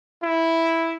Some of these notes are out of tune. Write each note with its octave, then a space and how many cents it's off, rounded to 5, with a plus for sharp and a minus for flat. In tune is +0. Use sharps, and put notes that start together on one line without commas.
E4 -5